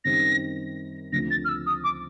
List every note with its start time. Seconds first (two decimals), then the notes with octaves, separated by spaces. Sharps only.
0.04 F#2 D#3 G3 C4 D#4 A#6
1.12 D2 C#3 F3 A3 C4 A#6
1.30 A6
1.44 F6
1.49 E6
1.66 D#6
1.84 D6